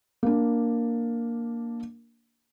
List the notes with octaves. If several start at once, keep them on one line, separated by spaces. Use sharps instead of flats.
A#3 D4